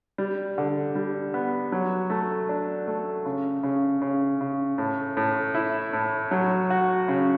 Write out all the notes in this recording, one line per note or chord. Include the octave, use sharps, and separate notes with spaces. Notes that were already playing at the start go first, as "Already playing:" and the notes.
G3
D3
G3
B3
F#3
A3
D4
A3
C#3
C#3
C#3
C#3
A2
A2
E4
A2
F#3
F#4
C#3